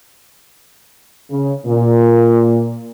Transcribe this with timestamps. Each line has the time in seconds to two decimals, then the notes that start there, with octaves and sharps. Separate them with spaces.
1.30 C#3
1.66 A#2